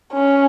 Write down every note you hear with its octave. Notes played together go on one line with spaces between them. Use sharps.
C#4